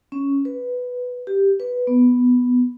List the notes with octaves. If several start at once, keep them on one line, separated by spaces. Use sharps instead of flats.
C#4
B4
G4
B4
B3